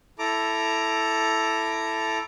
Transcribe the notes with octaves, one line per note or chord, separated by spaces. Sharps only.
E4 A4 A#5 D6